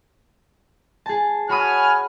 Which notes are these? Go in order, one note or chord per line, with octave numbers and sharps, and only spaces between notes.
G#4 A5
F#4 C#5 F#5 G#5 B5 D#6 F6